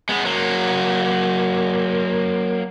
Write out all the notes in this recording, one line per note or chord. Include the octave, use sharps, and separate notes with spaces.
G#3 B3
F#3 A#3